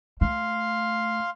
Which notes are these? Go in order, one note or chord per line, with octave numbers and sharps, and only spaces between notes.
A3 F5 C6